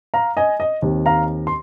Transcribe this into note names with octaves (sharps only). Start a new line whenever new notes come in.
F5 A#5
D#5 G#5
D#5
D#2 D#3 C4 D#4
F5 A#5
C6